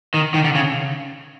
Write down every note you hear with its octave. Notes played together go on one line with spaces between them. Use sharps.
D#3
D#3
D3
C#3